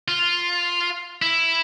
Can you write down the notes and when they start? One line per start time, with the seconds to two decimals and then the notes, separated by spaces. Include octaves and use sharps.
0.08 F4
1.22 E4